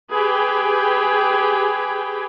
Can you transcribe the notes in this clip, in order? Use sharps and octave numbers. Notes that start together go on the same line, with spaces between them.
G4 G#4 B4 G5 G#5